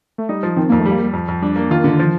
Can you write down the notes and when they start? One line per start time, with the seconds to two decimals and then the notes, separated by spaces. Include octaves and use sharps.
0.18 A3
0.29 G3 D#4
0.43 F3
0.57 D#3 C4
0.69 F2 A#3
0.80 A3
0.86 G3
0.91 A#3
0.99 G3
1.13 F2
1.28 F2
1.42 G3 D4
1.56 A#3
1.70 D#3 F4
1.84 D3
1.99 F3